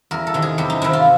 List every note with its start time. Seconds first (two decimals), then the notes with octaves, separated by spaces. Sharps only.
0.11 E2 A#4
0.27 A4
0.34 C3 D#3
0.42 G#4
0.58 E2 G4
0.70 D#4
0.82 C3 D#3 E4
0.93 F4